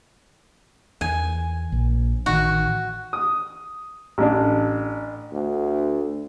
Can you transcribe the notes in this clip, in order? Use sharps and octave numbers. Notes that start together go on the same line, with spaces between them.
E2 G#5
A#1
A1 D#3 F#4
D#6
A1 D4
D2